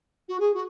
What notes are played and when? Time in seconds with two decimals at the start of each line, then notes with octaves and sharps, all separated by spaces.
0.28 F#4
0.40 G#4
0.54 F#4